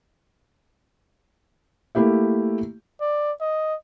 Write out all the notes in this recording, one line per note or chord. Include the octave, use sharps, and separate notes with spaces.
A3 A#3 E4 G4 E5
D5
D#5